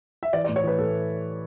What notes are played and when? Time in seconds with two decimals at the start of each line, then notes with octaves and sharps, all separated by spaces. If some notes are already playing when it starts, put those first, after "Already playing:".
0.23 E5
0.33 E3 D5
0.44 A2 D5
0.56 C#5
0.64 E3 B4
0.79 A2 A4